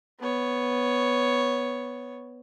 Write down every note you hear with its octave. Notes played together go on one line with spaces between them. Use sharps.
B3 C#5